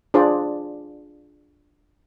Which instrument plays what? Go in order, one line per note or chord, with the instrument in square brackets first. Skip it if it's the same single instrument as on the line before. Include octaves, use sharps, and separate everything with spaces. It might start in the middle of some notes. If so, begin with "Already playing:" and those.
[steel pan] D4 F4 G#4 C5 D5